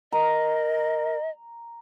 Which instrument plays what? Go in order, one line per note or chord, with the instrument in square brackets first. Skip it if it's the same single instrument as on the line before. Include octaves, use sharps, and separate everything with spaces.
[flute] A#4 [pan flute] D#5 [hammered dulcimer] A#5